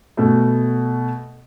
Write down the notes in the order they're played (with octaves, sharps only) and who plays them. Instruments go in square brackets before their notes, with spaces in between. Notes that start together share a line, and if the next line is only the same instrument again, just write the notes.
[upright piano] B2 A3